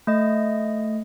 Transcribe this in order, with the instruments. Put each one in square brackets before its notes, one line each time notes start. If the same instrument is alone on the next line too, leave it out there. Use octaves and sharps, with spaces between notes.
[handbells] A3 D#5